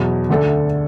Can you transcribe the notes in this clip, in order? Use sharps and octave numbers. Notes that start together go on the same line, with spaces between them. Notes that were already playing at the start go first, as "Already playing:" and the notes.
Already playing: E2 B2 F#3
D2 D3 A3 D4 A4